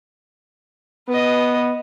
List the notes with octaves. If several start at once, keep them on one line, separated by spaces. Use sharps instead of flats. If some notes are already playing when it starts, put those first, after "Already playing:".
B3 B4 D#5